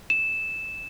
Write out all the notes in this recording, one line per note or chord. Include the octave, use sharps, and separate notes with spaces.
E7